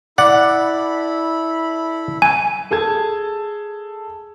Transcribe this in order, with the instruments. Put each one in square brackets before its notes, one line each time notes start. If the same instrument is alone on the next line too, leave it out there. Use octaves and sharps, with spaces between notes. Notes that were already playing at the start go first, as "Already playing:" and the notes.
[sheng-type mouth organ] E4 A4 B5 [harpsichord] D5 [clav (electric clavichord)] F#5
[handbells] G#5
[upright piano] G#4 A4 A5 G#6